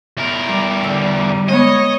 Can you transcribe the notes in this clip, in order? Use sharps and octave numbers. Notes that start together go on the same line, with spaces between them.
E2 A#4
G3
D3
G#3 B3 C#5 D#5